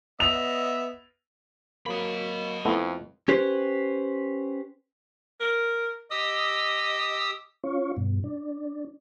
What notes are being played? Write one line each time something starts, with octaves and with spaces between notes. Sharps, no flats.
B3 D#5 E5 F7
F#3 A#3 D#5 B5
F2 A3 B3 E4
C#4 G4 B4 C5
A#4
G4 D#5 D#6 E6
C#4 F4 C#5
G2 B2
D4